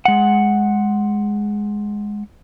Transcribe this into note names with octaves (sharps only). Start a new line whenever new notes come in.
G#3 F#5